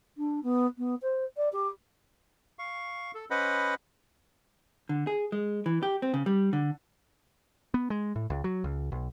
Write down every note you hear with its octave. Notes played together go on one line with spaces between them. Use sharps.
D4
B3
B3
C5
D5
G4
F5 C#6
A4
C#4 B4 C5 D#5 F#5 B5
D3
G#4
G#3
E3
G4
C4
C#3
G3
D3
B3
G#3
A2
C#2
F#3
C#2
B1